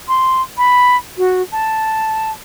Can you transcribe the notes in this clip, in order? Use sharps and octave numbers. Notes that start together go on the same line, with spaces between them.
C6
B5
F#4
A5